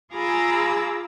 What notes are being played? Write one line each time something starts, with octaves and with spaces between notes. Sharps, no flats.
F4 G#4 A#5 B5 D6 E6